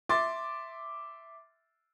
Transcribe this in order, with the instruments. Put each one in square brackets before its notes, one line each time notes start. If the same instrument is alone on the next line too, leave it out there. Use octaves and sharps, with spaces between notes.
[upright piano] E5 C6 D6 A6